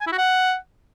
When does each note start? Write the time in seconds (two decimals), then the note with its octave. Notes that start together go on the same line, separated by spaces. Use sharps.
0.01 G#5
0.07 E4
0.12 F#4
0.18 F#5